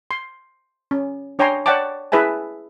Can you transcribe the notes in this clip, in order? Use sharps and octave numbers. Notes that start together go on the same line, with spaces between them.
C6
C#4
D4 C#5 G5 G#5 A#5 C6
C#5 D5 F#5 G5 A5 D6
E4 G#4 B4 E5 G#5 A5